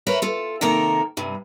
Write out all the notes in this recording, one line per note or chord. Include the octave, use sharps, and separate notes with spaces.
A#4 B4 C#5 E5
F4 A4
C3 D#3 A#3 A4 A#4 A#5
G2 C3